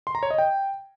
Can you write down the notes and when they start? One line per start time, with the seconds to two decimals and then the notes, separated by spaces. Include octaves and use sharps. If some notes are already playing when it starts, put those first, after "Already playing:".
0.07 C6
0.15 A#5
0.23 C#5
0.31 D#5
0.38 G5